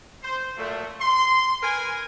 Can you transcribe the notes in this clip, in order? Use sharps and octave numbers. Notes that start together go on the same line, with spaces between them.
C5
A#2 F#3 A3
C6
A#4 B4 G#5